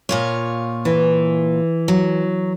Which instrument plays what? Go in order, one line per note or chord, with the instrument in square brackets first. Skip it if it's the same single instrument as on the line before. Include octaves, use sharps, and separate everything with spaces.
[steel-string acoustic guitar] A#2 F4 C#5
[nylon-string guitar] E3
[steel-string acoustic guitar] F#3